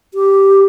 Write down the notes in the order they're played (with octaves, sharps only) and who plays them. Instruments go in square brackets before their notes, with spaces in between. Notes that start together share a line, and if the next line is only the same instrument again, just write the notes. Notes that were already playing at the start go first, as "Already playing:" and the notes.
[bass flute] G4